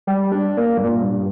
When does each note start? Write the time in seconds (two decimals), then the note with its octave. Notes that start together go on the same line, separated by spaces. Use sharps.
0.07 G3
0.32 D4
0.57 A#3
0.78 G2
0.84 A#2
1.02 G2